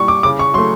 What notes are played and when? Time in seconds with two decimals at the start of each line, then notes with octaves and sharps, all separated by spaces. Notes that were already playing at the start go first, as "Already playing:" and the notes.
Already playing: A#2 G3 C#6
0.08 D6
0.23 C#3 D6
0.39 C#6
0.54 F#3 C6
0.58 A3